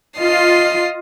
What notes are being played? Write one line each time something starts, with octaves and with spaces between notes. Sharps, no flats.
F4 D#5 C7